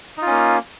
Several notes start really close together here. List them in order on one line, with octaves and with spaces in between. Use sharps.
D#4 F4 C#4 A#3